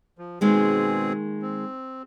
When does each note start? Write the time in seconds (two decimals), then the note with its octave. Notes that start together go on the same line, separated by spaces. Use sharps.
0.18 F3
0.41 B2 D#3 G#3 A#3 C4 G#4
1.42 C4